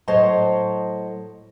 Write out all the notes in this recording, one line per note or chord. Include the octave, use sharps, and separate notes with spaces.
A2 F#3 C5 C#5 D#5 A5